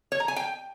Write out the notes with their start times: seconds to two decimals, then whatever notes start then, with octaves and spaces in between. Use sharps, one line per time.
0.12 C#5
0.20 A#5
0.28 G#5
0.36 G5